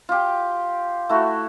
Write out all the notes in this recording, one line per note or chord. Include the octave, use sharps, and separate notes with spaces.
F4 G4
A3 E4 F#4